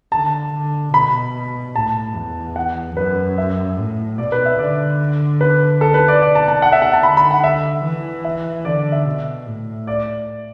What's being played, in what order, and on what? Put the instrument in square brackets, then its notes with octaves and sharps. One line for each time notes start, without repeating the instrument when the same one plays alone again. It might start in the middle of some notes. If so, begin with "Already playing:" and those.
[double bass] D3 [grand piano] A5
[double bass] D3
[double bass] B2 [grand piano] B5
[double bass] A2 [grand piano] A5
[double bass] E2
[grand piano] F#5
[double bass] F#2 [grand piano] B4
[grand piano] E5
[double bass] A2
[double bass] B2 [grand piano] D5
[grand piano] B4
E5
[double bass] D3 [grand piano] D5
[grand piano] B4
A4
B4
D5
[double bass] B2 [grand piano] D5
[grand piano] A5
A5
F#5
E5
F#5
A5
[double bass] D3 [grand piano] B5
[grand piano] B5
F#5
E5
[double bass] E3
[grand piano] E5
[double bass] D3 [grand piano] D5
[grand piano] E5
[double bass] B2
A2
[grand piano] D5